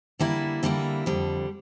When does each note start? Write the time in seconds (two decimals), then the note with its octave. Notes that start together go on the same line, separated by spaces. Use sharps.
0.19 D3 G3 A#3 E4
0.63 D3 G3 A#3 E4
1.06 F2 D3 G3